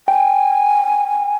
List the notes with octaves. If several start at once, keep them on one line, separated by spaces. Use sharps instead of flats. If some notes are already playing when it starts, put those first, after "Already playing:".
G5 G#5